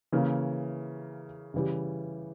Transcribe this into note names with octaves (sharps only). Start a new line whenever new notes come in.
C#3 E3 A#3
C#3 E3 G3